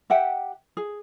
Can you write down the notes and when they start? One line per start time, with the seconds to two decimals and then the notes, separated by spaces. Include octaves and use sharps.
0.10 G4 E5 F#5 G5
0.77 G#4